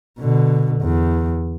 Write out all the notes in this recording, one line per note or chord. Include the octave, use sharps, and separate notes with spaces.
B2 D3
E2